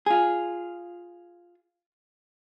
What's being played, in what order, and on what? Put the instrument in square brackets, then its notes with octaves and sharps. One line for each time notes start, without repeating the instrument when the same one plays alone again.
[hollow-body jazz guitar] F4 G#4